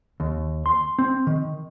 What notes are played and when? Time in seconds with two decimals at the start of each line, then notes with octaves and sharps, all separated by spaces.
0.20 D#2
0.66 C6
0.99 C4
1.27 D#3